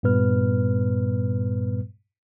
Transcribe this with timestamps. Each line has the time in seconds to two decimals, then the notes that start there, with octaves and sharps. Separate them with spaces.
0.03 G2 A#2 G3 B3 B4 F6